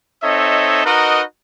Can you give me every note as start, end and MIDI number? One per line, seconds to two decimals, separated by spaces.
0.23 0.84 60
0.23 0.84 63
0.23 0.84 69
0.23 0.84 73
0.23 0.84 75
0.23 0.84 76
0.85 1.23 63
0.85 1.23 66
0.85 1.23 70
0.85 1.23 71
0.85 1.23 75